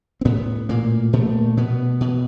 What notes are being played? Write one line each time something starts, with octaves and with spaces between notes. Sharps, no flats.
C4
A2 B3
A#2 A#3
A#2 A3
B2 B3
B2